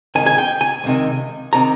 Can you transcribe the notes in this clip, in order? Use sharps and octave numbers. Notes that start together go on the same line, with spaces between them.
C#2 C3 D#3 G#5
G#5
G5
G#5
C#2 C3 D#3
C3 D#3 A#5